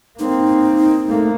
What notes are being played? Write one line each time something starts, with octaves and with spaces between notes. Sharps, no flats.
A#3 C4 D#4
A3 A#3